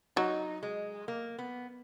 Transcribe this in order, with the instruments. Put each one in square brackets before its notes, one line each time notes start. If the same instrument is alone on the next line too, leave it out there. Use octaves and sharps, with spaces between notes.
[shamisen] F#3 [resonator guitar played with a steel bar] D#4
[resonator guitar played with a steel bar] G#3
A#3
B3